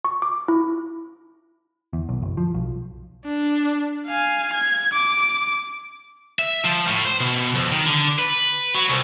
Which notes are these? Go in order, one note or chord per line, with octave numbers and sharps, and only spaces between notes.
C#6
D6
E4
E2
B1
F#1
F3
B1
D4
F5 G#5
G#6
D6
E5
F3
A2
C5
B2
F2
D#3
D3
B4
F#3
C2